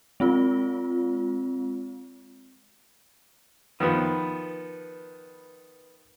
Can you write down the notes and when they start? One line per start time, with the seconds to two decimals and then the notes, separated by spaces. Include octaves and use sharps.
0.20 G#3 C4 F4
3.80 D#3 F3 B3 B4